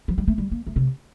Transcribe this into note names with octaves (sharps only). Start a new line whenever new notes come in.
F3
G3
A3
G3
A#3
A3
C3